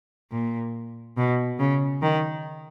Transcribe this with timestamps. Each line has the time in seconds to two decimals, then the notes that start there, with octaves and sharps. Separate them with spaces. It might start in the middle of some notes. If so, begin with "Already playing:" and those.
0.32 A#2
1.17 B2
1.59 C#3
2.02 D#3